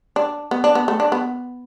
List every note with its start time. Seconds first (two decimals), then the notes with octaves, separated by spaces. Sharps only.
0.16 D4
0.51 B3
0.64 D4
0.75 B3
0.88 A3
1.00 D4
1.12 B3